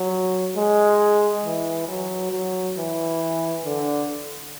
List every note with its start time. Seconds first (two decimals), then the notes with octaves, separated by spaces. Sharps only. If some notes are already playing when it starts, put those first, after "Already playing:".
Already playing: F#3
0.56 G#3
1.45 E3
1.88 F#3
2.32 F#3
2.77 E3
3.65 D3